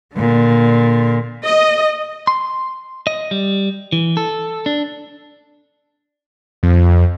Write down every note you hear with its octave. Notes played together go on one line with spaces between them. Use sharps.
A#2 D3
D#5
C6
D#5
G3
E3
A4
D4
F2